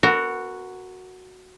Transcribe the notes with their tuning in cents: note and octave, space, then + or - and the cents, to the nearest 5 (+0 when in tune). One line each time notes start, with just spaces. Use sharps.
B3 +5 F#4 +0 A#4 -30